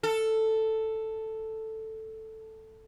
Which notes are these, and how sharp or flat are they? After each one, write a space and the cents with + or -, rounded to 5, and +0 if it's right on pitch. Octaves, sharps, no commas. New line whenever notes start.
A4 +5